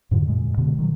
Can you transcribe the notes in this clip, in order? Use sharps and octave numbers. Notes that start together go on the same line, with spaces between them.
F2 G#2 D3
F#2 A#2 G#3
B2 D3
D#3 F#3